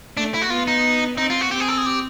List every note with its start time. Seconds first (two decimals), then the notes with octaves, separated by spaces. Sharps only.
0.17 A3 D4
0.34 E4
0.42 F#4
0.50 B3 F4
0.67 D#4
1.18 C4 D#4
1.30 F4
1.41 F#4
1.51 C4 G4
1.60 G#4
1.68 A4
1.78 G#4
1.86 G4